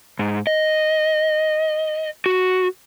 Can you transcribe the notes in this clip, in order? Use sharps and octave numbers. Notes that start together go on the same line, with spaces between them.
G#2
D#5
F#4